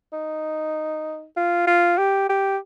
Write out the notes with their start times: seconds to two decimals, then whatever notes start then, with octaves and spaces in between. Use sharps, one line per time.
0.13 D#4
1.36 F4
1.67 F4
1.98 G4
2.29 G4